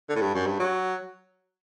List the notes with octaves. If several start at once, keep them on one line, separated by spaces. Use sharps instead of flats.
D3
A2
G2
F#2
G2
F#3